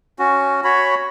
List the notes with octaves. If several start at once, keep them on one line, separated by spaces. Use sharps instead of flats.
C#4 F#4
F#4 C#5 B5